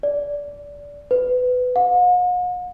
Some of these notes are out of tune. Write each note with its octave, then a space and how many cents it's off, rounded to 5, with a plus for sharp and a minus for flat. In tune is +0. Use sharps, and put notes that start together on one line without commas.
D5 -20
B4 +20
F#5 -45